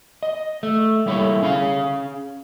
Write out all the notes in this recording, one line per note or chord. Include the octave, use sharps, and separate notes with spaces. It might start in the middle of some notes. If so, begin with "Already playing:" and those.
D#5
A3
G3 A#3 E4 A4 C#5
C#4 G#4 F5